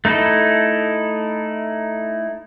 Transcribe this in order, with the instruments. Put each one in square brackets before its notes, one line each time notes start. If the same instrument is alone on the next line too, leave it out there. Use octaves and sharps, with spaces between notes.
[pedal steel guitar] A3 D#4 E4 A4